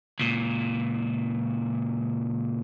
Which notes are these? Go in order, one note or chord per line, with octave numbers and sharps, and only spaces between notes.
C#2 A#2